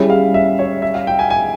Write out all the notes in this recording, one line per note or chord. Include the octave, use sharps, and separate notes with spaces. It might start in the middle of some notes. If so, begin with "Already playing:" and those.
Already playing: G3 C#4 E4 G#4 E5
F5
E5
C#5
E5
F5
G5
G#5
G#5